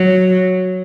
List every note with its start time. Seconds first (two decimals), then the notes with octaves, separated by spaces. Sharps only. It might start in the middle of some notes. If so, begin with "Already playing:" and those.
Already playing: F#3